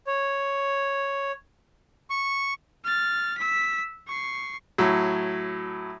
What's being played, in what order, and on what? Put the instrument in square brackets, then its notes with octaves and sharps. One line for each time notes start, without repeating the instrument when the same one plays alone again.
[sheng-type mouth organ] C#5
C#6
[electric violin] F6 A6
E6 B6
C#6 C7
[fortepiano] A2 F#3